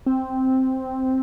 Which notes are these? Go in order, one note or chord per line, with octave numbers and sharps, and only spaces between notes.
C4